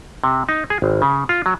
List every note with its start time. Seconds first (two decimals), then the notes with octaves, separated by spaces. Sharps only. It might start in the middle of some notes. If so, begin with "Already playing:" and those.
0.24 C3
0.49 D#4
0.70 G#4
0.82 G#1
1.02 C#3
1.29 F4
1.46 F#3